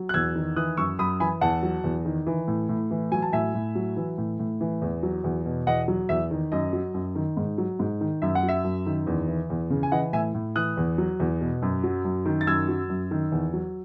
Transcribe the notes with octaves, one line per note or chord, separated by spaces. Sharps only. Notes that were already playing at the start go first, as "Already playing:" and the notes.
Already playing: F#3
F#6
E2 E6 G#6
D#3
E3 D#6 F#6
F#2 C#6 E6
F#2 B5 D#6
E3 G#5 B5
E2 F#5 A5
F#3
E2
D#3
E3
A2
A2
E3
F#3 G#5
A5
A2 E5 G#5
A2
F#3
E3
A2
A2
E3
E2
F#3
E2
B2
E2 D#5 F#5
F#3
E2 E5
D#3
F#2 D#5
F#3
F#2
D#3
G#2
F#3
G#2
D#3
F#2 E5
F#5
F#3
E5
F#2
D#3
E2
E3
E2
C#3
G#5
E3 D#5 F#5
A2 E5 G#5
A2
E3 D#6 F#6
E2
F#3
E2
B2
F#2
F#3
F#2
D#3
A6
F#2 E6 G#6
F#3
F#2
D#3
E2
F#3